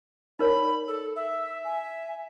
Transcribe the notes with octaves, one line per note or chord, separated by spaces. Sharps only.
D#4 A#4 C#5 D5 B5
A4 E6
E5 E6
G#5